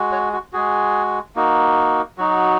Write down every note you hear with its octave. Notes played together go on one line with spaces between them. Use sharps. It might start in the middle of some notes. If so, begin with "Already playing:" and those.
Already playing: G#3 F#4
C#5
F#4
G#3 F#4 G#4
A#3 D#4 F#4
F#3 D#4 F#4